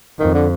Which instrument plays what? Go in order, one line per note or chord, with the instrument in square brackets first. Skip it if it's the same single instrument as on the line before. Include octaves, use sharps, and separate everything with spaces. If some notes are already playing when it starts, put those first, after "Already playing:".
[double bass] F2 [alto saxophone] D#3
[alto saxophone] D3